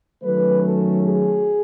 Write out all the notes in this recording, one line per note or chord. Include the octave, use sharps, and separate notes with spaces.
D#3 F#3 A3 C#4 B4
A4
G#4